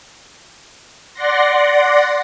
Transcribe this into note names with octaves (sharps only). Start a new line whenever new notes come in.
D5 F#5 C6 A#6